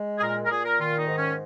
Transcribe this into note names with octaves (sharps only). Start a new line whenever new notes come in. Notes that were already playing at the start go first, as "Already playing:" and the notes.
Already playing: G#3
G#4
A#2 A#4
A#4
A#2 G#4
A#4
D#3 F4
D#4
G#2
C#4